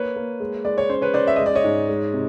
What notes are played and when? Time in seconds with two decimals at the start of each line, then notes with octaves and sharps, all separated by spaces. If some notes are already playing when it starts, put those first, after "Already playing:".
Already playing: A#3 B4 C#5
0.16 A#3
0.40 G#3
0.65 G#3 D5
0.78 C#5
0.90 C#4 C5
1.02 B4 C#5
1.14 C#4 C5 D5
1.27 E5
1.36 G#3 D#5
1.46 D5
1.55 C#5 D#5
1.64 G#2
1.89 G#3
2.13 C3